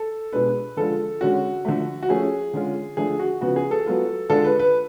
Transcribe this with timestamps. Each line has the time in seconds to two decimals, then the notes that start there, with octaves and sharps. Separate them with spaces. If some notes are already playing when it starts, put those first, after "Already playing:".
Already playing: A4
0.33 B2 G#3 D4 B4
0.77 D3 F3 G#3 D4 F4 A4
1.21 D3 G#3 C#4 F#4
1.65 D3 F3 A3
2.03 F#4
2.09 F3 A3 C#4 G#4
2.54 D3 G#3 C#4 F4
2.97 D3 F3 A3 D4 G#4
3.19 F#4
3.41 C#3 F3 B3 F#4
3.56 G#4
3.71 A4
3.86 F#3 B3 F4
4.30 D3 G#3 D4 F4 A4
4.44 B4
4.60 B4